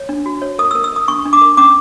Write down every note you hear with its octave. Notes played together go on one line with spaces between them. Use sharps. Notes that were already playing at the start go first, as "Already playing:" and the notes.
Already playing: C#5
D4
F#4
C#5
A#4 D#6
E6
A#4
E6
A#4 D#6
D4 C#6
D4
D6
A#4
C#4 D6